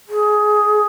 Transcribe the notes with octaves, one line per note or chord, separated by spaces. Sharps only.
G#4